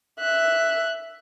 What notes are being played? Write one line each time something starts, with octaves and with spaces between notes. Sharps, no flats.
E5 F#6